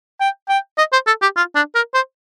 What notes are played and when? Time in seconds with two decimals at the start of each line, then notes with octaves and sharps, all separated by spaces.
0.20 G5
0.49 G5
0.78 D#5
0.93 C5
1.07 A4
1.22 G4
1.37 F4
1.55 D4
1.75 A#4
1.94 C5